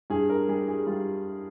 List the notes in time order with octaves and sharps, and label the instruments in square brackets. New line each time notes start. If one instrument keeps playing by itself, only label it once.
[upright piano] G2 G#4
A#4
G3 G#4
G#4
G3 F4